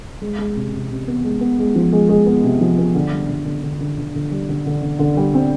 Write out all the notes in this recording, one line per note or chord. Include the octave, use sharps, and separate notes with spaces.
G#3
G#3
C3
C3
C3
B3
G#3
B3
G#3
F3
G#3
G#3
B3
C3
F3
B3
D3
G3
D3
D3
D3
D3
D3
D3
G3
D3
D3
D3
D3
G3
C4